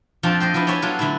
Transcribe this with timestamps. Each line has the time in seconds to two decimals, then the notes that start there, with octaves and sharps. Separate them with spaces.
0.23 F2 F3 D4 F4 G5 A5
0.40 D#5 E5 G5 C6
0.54 F3 B3 D4 E4
0.67 G4 A4 C#5 E5 G#5
0.82 F#3 B3 D4 F4 A4
0.99 D3 F#3 A3 E4